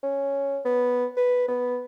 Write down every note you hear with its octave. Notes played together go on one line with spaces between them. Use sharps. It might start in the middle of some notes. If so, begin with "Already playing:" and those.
C#4
B3
B4
B3